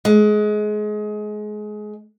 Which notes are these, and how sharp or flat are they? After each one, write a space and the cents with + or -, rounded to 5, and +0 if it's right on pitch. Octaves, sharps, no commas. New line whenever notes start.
G#3 +25